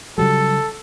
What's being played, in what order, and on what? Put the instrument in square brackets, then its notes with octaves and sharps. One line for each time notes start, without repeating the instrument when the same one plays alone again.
[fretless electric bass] C#3 F#3 G3 [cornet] A4